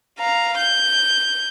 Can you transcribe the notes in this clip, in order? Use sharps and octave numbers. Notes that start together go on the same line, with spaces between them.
F5 A#5
G6